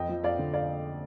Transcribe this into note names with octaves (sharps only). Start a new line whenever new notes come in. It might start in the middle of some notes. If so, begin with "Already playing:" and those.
Already playing: F2 D#5 G5
F3
F2 D5 F5
D3
D5 F5